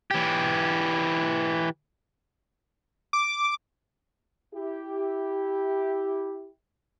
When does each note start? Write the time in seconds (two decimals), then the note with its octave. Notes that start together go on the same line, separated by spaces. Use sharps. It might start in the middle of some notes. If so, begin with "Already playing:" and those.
0.11 E3 G4
3.13 D6
4.54 E4 G4